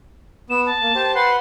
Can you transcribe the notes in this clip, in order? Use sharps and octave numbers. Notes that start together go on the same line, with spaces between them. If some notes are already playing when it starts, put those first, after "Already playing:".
B3 E7
A5
A#3
G4 C5
B4 F#5 C6